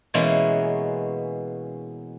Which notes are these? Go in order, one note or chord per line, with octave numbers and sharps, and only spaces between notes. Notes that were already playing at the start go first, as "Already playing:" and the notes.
B2 E3 G#3 A#3 B3 C#4